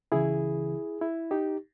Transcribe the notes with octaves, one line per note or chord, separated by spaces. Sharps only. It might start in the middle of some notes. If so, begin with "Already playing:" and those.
C#2 C#3 E3 E4 G#4
E4
D#4 G4